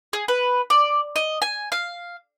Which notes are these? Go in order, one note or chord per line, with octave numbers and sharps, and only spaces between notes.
G#4
B4
D5
D#5
G#5
F5